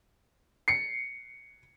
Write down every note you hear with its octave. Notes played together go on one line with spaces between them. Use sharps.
C7 C#7